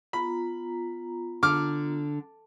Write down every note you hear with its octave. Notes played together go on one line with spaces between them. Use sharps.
B3 F4 A#5 B5
D3 D6 F6